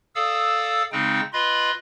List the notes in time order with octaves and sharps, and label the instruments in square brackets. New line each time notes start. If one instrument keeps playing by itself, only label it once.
[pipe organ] A4 D5 F5 D#6 E6
C#3 G#3 C4 D#4 G5
F4 B4 D#5 B5 C6